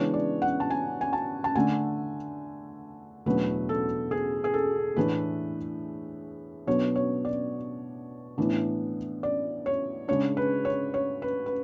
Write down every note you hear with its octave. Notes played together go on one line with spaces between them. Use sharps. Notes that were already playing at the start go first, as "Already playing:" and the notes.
Already playing: C#3 E3 G#3 B3 D4 C#5
D5
F#5
A5
G#5
G#5
A5
A5
D3 A3 D4 G#5
E2 B2 F#3 A3 D4 B4
A4
G#4
G#4
A4
A2 E3 A3 D4 B4
B2 F#3 B3 D4 C#5
C#5
D5
A2 E3 B3 D4
D5
C#5
C#3 G#3 D4 C#5
B4
C#5
C#5
B4
B4